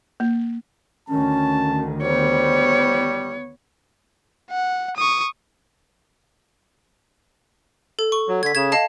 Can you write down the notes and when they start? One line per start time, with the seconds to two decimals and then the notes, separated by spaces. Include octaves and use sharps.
0.20 A#3
1.09 D2 D#3 C#4 A5
2.02 G3 B3 C5 C#5
4.51 F#5
4.96 C#6 D#6
7.99 A4
8.12 C#6
8.28 F#3
8.43 D3 G#6 B6
8.55 C#3 G#6 E7
8.72 D#5 F5 A5